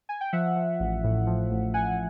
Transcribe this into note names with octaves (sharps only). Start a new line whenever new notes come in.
G#5
G5
F3 E5 F#5
F3
A1
A2
F3
A1
A1 F#5 G#5